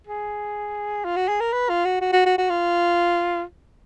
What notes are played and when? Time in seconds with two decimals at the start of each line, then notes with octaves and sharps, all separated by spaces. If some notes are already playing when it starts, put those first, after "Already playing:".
0.07 G#4
1.05 F4
1.16 F#4
1.28 G#4
1.40 A#4
1.53 B4
1.69 F4
1.85 F#4
2.01 F#4
2.13 F#4
2.26 F#4
2.38 F#4
2.50 F4